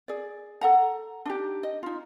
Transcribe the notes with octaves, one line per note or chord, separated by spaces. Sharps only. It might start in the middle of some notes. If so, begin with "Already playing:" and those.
G#4 D5
A4 F#5 A#5
D4 D#4 G4
D#5
D#4 F4